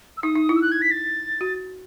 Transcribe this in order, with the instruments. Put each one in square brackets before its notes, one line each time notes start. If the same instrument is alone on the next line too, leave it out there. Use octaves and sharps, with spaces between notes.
[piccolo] E6
[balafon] D#4 [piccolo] D#6
[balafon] D#4
E4
[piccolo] E6
F#6
G#6
B6
A6
[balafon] F#4